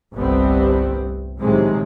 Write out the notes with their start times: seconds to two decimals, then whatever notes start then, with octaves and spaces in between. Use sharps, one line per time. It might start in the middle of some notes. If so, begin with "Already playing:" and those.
0.14 G1 C2 G3 A3 B3 C4
1.37 A#1 A2 C3 D#3 F#3 G#3